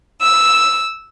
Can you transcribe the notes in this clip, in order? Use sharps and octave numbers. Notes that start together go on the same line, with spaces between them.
E6